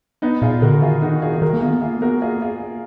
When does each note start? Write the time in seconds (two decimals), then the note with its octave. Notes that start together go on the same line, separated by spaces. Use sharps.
0.22 B3 D#4
0.42 A#2 F4 G#4
0.62 D3 F#4 A#4
0.82 D#3 F4 G#4
1.02 D#4 F#4
1.22 F4 G#4
1.33 G#4
1.42 D#3 F#4 A#4
1.53 A#3
1.62 B3 F4 G#4
1.82 A#3 F4 G#4
2.02 B3 F#4 A#4
2.22 A#3 F4 G#4
2.42 F4 G#4